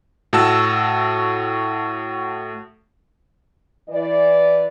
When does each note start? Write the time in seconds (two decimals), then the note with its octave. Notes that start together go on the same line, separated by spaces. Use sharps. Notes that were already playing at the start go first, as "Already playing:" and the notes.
0.33 A2 F#4 A5 E6
3.89 E3 D5